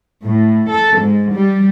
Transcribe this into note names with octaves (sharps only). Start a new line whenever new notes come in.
A2
A4
G#2
G3